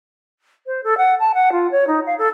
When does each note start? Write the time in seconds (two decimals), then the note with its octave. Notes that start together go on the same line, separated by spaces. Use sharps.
0.67 C5
0.84 A4
0.98 F#5
1.20 A5
1.34 F#5
1.52 F4
1.72 C#5
1.87 D#4
2.06 F5
2.18 A4